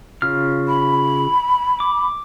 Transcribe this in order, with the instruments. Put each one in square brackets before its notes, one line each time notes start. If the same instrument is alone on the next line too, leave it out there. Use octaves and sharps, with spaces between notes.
[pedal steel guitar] C#3 F4 F6
[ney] B5
[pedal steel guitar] D6